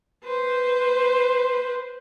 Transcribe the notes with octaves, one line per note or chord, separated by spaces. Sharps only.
B4 C5